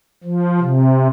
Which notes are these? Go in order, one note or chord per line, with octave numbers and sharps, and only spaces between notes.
F3
C3